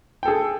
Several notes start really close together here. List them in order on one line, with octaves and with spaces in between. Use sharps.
G5 A4 G#4